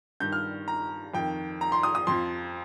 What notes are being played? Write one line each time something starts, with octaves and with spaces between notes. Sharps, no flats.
G2 D#3 G6
F6
A#5
F2 D#3 G5
A#5
C6
D#6
D#6
F2 F3 C6